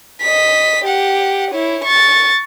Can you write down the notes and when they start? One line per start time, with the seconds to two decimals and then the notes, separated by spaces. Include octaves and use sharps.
0.21 D#5 B6
0.85 G4 F#5
1.51 E4 C#5
1.84 C#6 A6